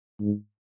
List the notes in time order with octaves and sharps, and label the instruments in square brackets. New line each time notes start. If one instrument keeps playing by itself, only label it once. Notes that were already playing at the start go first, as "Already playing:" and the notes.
[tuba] G#2